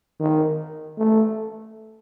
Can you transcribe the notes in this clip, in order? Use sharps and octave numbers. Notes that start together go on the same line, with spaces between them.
D#3
A3